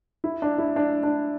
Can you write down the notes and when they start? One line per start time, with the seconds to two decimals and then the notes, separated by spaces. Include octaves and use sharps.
0.24 E4
0.42 D4
0.58 E4
0.76 D4
1.03 D4